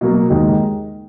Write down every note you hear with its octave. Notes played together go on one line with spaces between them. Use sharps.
B2 F#3 A#3
D#2 D#3 G#3 D#4